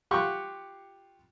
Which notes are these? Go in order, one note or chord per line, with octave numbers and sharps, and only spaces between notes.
F4 G4 F#5 C6 C#6